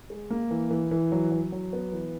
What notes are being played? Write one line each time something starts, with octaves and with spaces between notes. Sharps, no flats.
G#3
A#3
E3
E3
E3
F#3
F#3
F#3
B3
E3